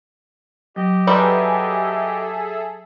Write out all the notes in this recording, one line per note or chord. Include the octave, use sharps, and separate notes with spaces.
F#3 G4 D#5
F#3 G3 G#4 A4 B4 D5 E5 C6